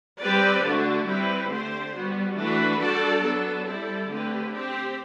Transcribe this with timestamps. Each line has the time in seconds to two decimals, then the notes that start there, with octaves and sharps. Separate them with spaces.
0.21 G3 C4 G4 B4 D5
0.63 D3 A3 D4 F#4
1.07 G3 C4 E4 G4 B4
1.50 D3 A3 C4 G4 C5
1.93 G3 B3 F#4
2.36 E3 A3 D4 F#4 B4
2.80 G3 D4 F#4 A4 D5
3.23 F#3 B3 D4 A4
3.66 G3 C4 E4 A4 D5
4.08 D3 A3 C4 G4 B4
4.52 C4 G4 C5